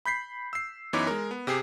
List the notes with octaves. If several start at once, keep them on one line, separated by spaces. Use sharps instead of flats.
B5 G6 B6 C7
E6 C7
F#2 E3 B3 D#4 C#5 D6
G#3 A#4
B3
C3 G4 G#4 C7